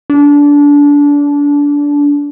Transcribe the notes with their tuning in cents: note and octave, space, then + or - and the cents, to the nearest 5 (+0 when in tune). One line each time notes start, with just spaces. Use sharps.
D4 -25